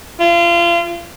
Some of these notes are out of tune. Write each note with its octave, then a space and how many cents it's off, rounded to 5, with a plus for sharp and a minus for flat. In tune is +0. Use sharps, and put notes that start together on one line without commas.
F4 -30